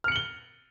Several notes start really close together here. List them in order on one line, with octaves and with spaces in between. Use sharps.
F6 C#7 F#7 G7